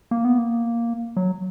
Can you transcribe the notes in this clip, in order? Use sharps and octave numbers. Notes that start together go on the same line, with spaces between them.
A#3
B3
A#3
F#3